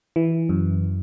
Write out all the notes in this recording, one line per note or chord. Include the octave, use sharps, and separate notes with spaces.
E3
F#2